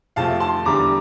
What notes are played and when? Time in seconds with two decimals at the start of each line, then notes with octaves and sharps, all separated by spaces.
0.16 F2 C3 F3 A3 F5 A5
0.40 A5 C6
0.65 E2 D3 G3 A#5 D6